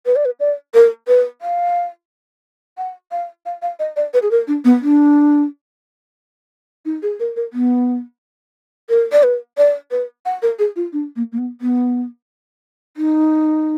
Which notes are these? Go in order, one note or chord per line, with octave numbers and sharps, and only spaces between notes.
B4
D5
B4
D5
A#4
B4
F5
F#5
F5
F5
F5
D#5
D5
B4
G#4
A#4
D4
B3
D4
D#4
G#4
A#4
A#4
B3
A#4
D5
B4
D5
B4
F#5
A#4
G#4
F4
D4
A#3
A#3
B3
B3
D#4